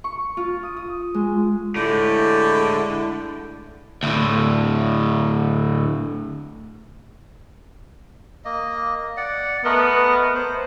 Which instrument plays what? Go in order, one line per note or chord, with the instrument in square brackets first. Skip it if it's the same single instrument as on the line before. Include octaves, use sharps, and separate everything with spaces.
[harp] C#6
F4
D#6
D#6
G#3
[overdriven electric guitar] A2 [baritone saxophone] D3 [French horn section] G#3 E4 [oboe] G4
[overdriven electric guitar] D2 A2
[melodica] A#3 D#5
D5 F#5
[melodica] A3 A#4 D#5 [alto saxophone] B3
[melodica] C5